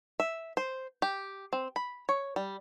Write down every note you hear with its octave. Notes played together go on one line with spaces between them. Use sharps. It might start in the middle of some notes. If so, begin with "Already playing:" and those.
E5
C5
G4
C4
B5
C#5
G3